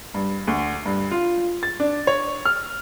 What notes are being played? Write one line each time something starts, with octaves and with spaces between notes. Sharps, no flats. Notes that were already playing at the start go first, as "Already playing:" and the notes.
G2
D2
G2
F4
A6
D4
C#5
F6